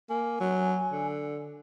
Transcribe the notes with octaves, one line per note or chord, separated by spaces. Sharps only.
A#3 G#5
F#3
D3